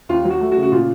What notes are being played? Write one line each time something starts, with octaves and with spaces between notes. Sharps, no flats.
D#2 F4
F#3
F#4
A3
F#4
C#3
F#4
A#2 F4